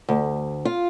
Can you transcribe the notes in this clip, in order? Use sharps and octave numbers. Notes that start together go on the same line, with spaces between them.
D2
F4